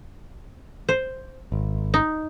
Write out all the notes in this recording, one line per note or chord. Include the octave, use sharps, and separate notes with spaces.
C5
G#1
D#4